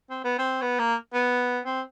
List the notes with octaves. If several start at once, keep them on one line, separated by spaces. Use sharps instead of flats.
C4
B3
C4
B3
A#3
B3
C4